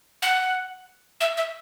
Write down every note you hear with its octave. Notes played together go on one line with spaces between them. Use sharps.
F#5
E5
E5